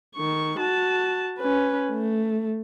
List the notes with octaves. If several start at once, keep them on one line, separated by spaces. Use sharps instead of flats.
D#3 C#6
F#4 A5
C#4 B4
A3